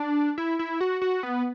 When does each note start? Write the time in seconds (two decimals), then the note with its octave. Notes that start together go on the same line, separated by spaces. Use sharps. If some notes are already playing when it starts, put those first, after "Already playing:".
Already playing: D4
0.38 E4
0.59 E4
0.81 F#4
1.02 F#4
1.23 B3